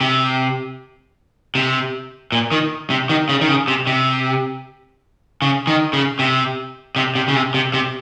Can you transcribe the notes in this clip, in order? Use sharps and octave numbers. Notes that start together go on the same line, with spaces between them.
C3
C3
A#2
D#3
C3
D#3
C#3
D#3
C#3
C3
C3
C#3
D#3
C#3
C3
C3
C3
C#3
C3
C3
C3